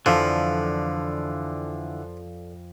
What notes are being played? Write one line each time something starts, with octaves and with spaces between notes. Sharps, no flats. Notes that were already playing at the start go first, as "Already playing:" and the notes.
F2 D3 E3 F3 A4 D5 F5